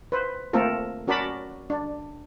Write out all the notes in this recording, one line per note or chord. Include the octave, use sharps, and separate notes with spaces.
B4 C5
A3 A#3 C4 F4 A4 A#4
C#4 F#4 A#4 D5 A5 B5
D4